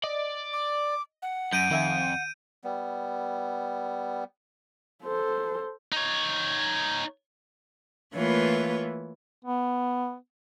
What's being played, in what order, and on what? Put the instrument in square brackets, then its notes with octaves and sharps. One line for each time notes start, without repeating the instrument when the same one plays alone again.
[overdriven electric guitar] D5 [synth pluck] D#5
[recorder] D6
F#5
[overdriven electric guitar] F#2 [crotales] G6 D7 D#7
[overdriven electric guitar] F2 [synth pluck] D#3 E5 G#5
[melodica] G3 B3
[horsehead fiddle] A4 C5
[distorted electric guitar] D#4 C#5
[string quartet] E3 A3 A#3 F4 B4 C#5
[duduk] B3